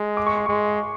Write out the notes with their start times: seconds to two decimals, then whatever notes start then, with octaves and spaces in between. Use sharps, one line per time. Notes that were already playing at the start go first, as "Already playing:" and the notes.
Already playing: G#3
0.17 D6
0.27 C#6
0.37 C6
0.46 G#3 C#6